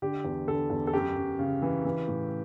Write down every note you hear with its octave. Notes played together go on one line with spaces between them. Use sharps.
D3 G4
E2
D3 A4
E2
A4
F#2 G4
F#2
C#3
E3
E3
A2